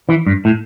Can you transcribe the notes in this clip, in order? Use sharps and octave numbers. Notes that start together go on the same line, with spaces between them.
E3
G2
A2